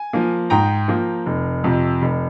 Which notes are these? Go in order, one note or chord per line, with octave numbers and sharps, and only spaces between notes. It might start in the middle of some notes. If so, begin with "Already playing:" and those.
Already playing: G#5
F3 A#3
G#2 G5 A#5
F3 A#3
F1
F2 C3
F1